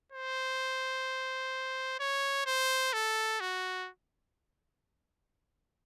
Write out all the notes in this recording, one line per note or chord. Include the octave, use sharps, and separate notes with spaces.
C5
C#5
C5
A4
F#4